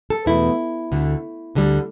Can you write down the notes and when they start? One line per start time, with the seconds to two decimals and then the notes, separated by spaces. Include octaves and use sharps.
0.10 A4
0.26 E2 B2 A3 E4
0.92 D2 D3 A3
1.55 D2 D3 G3